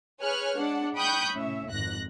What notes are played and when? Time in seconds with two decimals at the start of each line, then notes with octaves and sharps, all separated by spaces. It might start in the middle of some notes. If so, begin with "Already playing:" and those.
0.20 G#4 B4 C#5 G#5 F6 F#6
0.56 G#3 D4 F#5
0.96 G5 B5 C#6 D#6 F#6 G6
1.33 A2 C#4 E5
1.71 G#1 F2 G#2 F#6 A#6